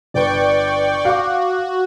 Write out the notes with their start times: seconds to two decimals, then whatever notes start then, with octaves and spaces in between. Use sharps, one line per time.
0.14 G1 B4 D5 G5 C#6
1.05 F#4 F5 D6